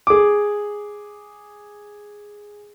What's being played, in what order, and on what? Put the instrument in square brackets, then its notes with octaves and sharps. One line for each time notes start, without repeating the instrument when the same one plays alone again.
[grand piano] G#4 D6